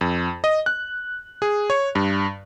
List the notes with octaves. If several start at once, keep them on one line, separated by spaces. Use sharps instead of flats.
F2
D#5
F#6
G#4
C#5
G2